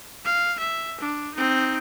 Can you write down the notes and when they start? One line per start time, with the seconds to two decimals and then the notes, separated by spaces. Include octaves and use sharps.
0.25 F5
0.60 E5
1.01 D4
1.35 C4 D#4